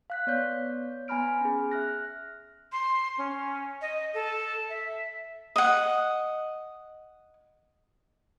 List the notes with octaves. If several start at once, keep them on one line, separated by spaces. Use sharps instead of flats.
F5 F#6 B6
B3 C#5 D5 G6
B3 G#5 A#5 B5 F6 D7
C#4 G#4
E5 F6 F#6 A#6
C6
C#4
D#5
A4
E5
D#5 F#5